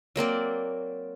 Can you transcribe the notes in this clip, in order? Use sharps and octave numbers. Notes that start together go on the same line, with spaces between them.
F#3 A#3 C4 D5